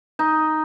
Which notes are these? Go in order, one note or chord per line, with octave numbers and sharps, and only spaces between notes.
D#4